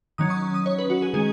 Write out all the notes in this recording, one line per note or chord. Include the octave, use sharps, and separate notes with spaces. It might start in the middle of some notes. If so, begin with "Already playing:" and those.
D#3 F#3 C#4 D#6
C#6
D#6
C#5
B4
F#4
G#4
D#3 G#3 C#4 G#4